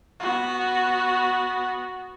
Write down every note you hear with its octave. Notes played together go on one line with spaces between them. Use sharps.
B3 F#4